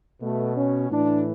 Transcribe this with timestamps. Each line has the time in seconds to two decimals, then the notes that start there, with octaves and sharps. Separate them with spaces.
0.21 B2 A3
0.56 C#4
0.90 A2 E3 D4